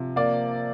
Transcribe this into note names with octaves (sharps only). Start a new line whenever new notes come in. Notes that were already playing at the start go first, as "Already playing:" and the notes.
Already playing: C3 F3
A#3 D5